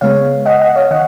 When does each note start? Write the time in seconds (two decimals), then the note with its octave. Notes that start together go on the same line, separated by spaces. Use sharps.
0.01 C#3 G#3 B3 C#5 F5
0.46 D#5 F#5
0.61 D#5 F#5
0.76 C#5 F5
0.91 D#3 D#5 F#5